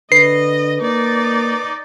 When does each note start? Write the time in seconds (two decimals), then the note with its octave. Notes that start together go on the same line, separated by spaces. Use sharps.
0.12 D3 B4 D#5 C7
0.81 A#3 D#4 D5